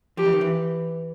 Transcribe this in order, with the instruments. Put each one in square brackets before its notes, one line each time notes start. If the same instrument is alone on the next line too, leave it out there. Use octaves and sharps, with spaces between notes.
[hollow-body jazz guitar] F3 [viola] G4
[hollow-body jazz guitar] E3
D#3
E3